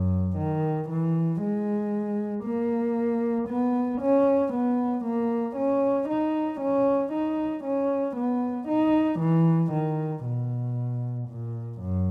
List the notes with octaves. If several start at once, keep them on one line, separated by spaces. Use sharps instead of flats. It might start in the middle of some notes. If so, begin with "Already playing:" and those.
Already playing: F#2
D#3
E3
G#3
A#3
B3
C#4
B3
A#3
C#4
D#4
C#4
D#4
C#4
B3
D#4
E3
D#3
B2
A#2
F#2